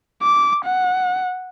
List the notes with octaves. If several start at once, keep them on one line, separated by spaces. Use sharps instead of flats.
D6
F#5